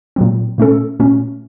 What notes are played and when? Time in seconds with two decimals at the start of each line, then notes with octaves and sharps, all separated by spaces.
0.16 A#2 F#3 C4
0.58 A#2 A3 C#4 A4
1.00 A#2 A3 C#4